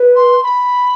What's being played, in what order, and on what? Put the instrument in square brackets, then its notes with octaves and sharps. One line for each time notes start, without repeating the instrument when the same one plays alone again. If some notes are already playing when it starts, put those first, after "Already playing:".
Already playing: [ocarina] B4
[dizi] C6
B5